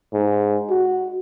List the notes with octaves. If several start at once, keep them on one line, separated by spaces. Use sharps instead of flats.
G#2
F#4